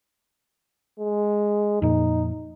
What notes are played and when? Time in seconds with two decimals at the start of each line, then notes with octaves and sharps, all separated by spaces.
0.99 G#3
1.82 F2 A#2 D#4